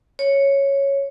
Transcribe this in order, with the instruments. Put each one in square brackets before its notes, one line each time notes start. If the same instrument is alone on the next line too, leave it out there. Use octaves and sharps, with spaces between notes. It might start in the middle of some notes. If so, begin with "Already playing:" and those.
[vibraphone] C#5